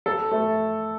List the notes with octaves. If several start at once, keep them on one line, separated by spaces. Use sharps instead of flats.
A4
A3